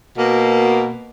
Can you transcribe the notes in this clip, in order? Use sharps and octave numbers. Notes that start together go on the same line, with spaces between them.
B2 A#3